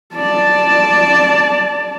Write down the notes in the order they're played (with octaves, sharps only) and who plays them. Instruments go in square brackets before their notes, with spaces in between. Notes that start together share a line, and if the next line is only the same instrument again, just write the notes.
[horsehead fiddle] D5 A5